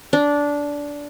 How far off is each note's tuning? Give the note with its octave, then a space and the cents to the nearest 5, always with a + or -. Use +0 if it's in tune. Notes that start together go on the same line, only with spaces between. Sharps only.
D4 -15